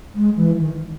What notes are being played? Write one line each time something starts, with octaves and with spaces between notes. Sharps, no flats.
G#3
E3
D#3